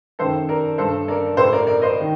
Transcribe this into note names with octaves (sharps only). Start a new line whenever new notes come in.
F#2 D#3 A4 C5
A#4 D5
G2 D3 A4 C5
A#4 D5
A2 A4 C5
A#4 D5
A#4 D5
C5 D#5
D#3